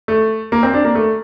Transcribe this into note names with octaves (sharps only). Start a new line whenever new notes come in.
A3
A#3
C4
D4
A#3
A3